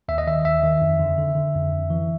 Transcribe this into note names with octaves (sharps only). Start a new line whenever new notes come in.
D#2 E5
D#5
D#3 E5
D#2 E5
D#3
F2
D3
D3
D3
F2
F2
E3